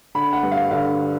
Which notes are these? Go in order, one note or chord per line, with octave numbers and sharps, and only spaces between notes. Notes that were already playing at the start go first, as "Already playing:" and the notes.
D3 B5
F#5
G2
F5
D3 F5